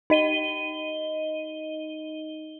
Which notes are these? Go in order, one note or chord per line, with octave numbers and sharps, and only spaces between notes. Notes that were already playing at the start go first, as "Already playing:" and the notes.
D#4 D#5 D#7 G7